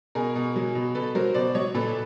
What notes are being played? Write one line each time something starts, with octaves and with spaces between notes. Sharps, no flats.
B2 G#4 A#4
B2
F#3
B2
B2 A4 B4
F#3 A#4 C5
B2 C5 D5
F#3 C#5 D#5
A#2 A4 B4